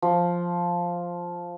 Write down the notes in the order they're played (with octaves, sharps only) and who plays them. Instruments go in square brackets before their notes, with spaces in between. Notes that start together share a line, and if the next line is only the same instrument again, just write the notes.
[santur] F3